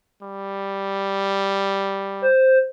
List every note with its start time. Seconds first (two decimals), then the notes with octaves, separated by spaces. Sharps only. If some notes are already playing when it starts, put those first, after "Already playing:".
0.23 G3
2.22 C5